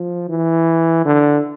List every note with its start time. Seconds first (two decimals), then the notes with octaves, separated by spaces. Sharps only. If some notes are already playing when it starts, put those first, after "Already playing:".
Already playing: F3
0.29 E3
1.05 D3